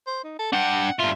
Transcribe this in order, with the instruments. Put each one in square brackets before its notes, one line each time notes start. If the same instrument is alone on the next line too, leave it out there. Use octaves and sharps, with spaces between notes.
[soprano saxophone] C5
D#4
A4
[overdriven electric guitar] D4 G5 [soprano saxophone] F#5
[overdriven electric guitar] G2 F4 [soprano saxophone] E5